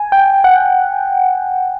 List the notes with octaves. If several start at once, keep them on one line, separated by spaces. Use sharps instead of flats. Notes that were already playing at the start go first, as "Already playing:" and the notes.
Already playing: G#5
G5
F#5